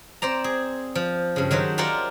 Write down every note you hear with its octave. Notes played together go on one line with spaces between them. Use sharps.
C4 C5 D5 A#5
G#4
F3
G2 C#3
D#3 F#3 F#4 C5
F4 G4 A#4 C5 D5 F#5